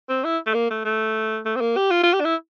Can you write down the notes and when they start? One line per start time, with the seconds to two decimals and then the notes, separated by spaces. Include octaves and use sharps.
0.09 C4
0.24 E4
0.46 A3
0.54 A#3
0.70 A3
0.84 A3
1.45 A3
1.56 C4
1.61 A#3
1.76 G4
1.91 F4
2.03 F4
2.13 G4
2.20 D4
2.25 E4